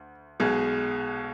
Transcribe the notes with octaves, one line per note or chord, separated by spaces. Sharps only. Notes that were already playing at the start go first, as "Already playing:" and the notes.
Already playing: D2
B1 B2 G#3 G#4